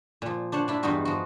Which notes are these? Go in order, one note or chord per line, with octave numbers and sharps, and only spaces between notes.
A#2 F3
D4 C5 C#5 F#5
D4 E4 F4
E2 G2 B3 D#4 F#4 G#4
F3 F#4